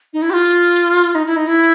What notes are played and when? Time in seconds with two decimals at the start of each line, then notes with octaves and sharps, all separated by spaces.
0.13 D#4
0.22 E4
0.30 G4
0.33 F4
1.15 D#4
1.26 E4
1.36 D#4
1.47 E4